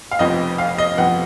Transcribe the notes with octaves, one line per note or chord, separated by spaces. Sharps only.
F5
F1 F2 F3 B3 D#5
F5
D#5
F2 F3 B3 F#5